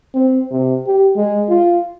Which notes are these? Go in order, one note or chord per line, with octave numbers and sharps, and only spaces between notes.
C4
C3
G4
G#3
F4